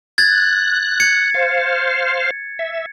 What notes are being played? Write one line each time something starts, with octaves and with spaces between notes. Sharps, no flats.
F#6 G#6 A6
G#6 C#7
C5 F5
E5